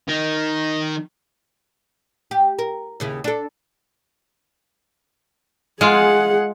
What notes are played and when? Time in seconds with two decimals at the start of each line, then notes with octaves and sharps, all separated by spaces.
0.08 D#3 D#4
2.31 G4
2.59 A#4
3.00 D#2 C#3 E4
3.24 D4 A4
5.81 G#3 F4 G#4 F#5